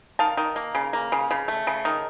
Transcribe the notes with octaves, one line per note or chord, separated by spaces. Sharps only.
D#3 F5 A5
D#3
A#3
C#3
A#3
C#3
C#3
A3
C#3
D#3